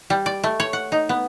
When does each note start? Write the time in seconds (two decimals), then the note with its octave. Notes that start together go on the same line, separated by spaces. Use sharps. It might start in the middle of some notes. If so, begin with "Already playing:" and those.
0.10 G3
0.26 D5
0.44 A3
0.60 C#5
0.73 F#5
0.92 D#4
1.09 B3